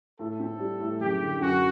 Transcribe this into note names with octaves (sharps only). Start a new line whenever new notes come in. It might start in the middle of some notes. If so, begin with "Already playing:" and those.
A2 A4
C4
G3
A2
F#1 G4
D3
F#2 F#4